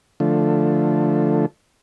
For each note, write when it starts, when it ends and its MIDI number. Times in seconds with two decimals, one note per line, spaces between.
0.20 1.46 50
0.20 1.46 53
0.20 1.46 57